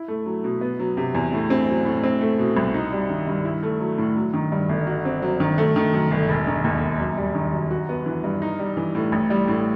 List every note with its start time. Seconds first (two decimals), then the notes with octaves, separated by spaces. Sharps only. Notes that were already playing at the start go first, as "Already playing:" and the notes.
Already playing: E4
0.08 A3
0.26 F#3
0.44 B2
0.61 B3
0.80 F#3
0.97 C3
1.14 E2
1.33 A2
1.50 C4
1.68 F#3
1.85 A2
2.03 C4
2.21 A3
2.39 B2
2.57 C2
2.74 D#4
2.92 G3
3.10 D#3
3.28 G2
3.45 E4
3.63 A3
3.80 F#3
3.98 A2
4.16 F#3
4.34 D#3
4.52 G2
4.69 G1
4.87 F#4
5.05 C4
5.22 F#3
5.40 D#3
5.58 A3
5.76 D#3
5.94 F#2
6.11 G1
6.29 E1
6.47 D#3
6.64 D#2
6.82 E1
7.00 F#2
7.17 G3
7.35 D#3
7.53 F#2
7.71 F#4
7.89 B3
8.06 E3
8.24 G2
8.42 D#4
8.59 G3
8.77 E3
8.95 A2
9.12 A1
9.30 G3
9.48 A2